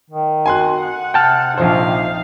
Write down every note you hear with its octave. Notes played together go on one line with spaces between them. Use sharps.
D#3
F#4 G#5 C6 F#6
F#5
C3 G5 A5 F6
A#1 F3 D#4 C5 F5